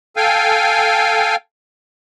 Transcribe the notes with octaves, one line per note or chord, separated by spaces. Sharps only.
A4 F5 G5 G#5